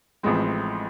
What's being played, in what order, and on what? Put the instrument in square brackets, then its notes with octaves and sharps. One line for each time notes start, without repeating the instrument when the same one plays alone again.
[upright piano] A1 A2 F3 G#3 C4